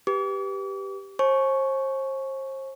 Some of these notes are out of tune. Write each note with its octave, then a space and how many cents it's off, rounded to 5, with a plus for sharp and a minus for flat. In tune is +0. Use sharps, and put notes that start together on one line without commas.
G4 +0 B4 +0 D6 -45
C5 +40 G#5 +45 C#6 +0